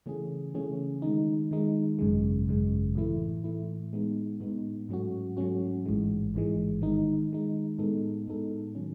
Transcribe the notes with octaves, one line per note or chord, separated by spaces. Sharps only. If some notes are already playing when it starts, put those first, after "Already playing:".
C#3 E3 A3 C#4 G#4
C#3 E3 A3 C#4 G#4
D#3 G#3 D#4
D#3 G#3 D#4
G#1 F#2 C#3 G#3
G#1 F#2 C#3 G#3
A2 E3 A3 E4
A2 E3 A3 E4
A2 G#3 B3 D#4
A2 G#3 B3 D#4
G#2 F#3 A3 C#4 F#4
G#2 F#3 A3 C#4 F#4
A1 G#2 E3 G#3
A1 G#2 E3 G#3
D#3 G#3 D#4
D#3 G#3 D#4
A2 G#3 B3 D#4 A4
A2 G#3 B3 D#4 A4
D#3 F#3 C#4